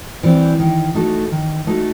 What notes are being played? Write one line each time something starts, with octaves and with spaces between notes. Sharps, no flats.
E3 G3 C4
D#3
A3 D#4 F#4 A4
D#3
A3 D#4 F#4 A4